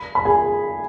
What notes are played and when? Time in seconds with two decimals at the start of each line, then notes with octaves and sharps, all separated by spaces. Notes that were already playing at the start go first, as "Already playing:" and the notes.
Already playing: B5
0.15 B5
0.25 G#4 G#5